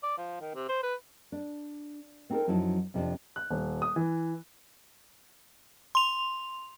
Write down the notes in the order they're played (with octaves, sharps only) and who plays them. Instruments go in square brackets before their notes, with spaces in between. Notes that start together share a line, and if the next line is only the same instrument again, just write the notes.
[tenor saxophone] D5
F3
D#3
C3
C5
B4
[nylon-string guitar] D4
B3 C4 D#4 F#4 A4 A#4
F#2 F3 F#3 D#4 E4 A5
F2 C3 F3 G3 C4 D4
[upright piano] F#6
D#1
D#6
E3
[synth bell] C6 F7